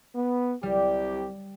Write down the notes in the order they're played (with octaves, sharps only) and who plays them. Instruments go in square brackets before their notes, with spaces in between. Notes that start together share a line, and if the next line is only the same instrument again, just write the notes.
[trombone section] B3
[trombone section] C2 G4 [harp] G3